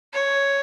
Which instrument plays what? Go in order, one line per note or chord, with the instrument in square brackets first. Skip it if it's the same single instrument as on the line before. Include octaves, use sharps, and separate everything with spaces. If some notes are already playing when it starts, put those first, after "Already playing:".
[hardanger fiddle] C#5